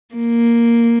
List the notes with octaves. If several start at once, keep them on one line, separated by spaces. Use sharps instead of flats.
A#3